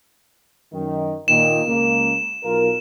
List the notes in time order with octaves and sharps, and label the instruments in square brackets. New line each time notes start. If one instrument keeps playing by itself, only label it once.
[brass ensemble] F#2 D#3
[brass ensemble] A#2 D#3 [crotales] E7
[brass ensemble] C#2 A#3
B1 F4 A#4